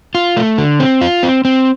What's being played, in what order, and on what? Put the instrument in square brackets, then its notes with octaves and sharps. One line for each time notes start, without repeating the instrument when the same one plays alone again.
[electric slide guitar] F4
A3
D3
C4
F4
C4
C4